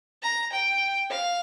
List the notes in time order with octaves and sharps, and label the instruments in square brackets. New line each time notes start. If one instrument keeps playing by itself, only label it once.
[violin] A#5
G5
F5